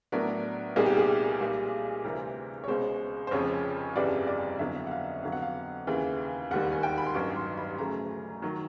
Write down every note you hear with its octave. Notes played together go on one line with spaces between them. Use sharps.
A2 F#3 B3 D4 A#4
C2 A#2 G3 B3 D#4 G#4
G4
G#4
B1 A#2 G3
D2 C3 E3 G3 C4 A#4
C#5
C#2 B2 G#3 C5
C5
F1 F2 C#3 F3 C#5
G1 F2 C#3 E3 G3 D5
D5
F2 D3 F#3 B3 E4 E5
F#5
F5
F2 D3 F#3 B3 F5
F#5
F5
D#2 C#3 E3
E1 D#2 D#3 G3 F#5
G#5
G5
B5
C6
A1 G2 D#3 F#3 C#6
C6
B5
D2 C#3 F#3 A3 A#5
D#3 F#3